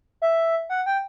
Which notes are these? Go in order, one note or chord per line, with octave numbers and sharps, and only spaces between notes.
E5
F#5
G5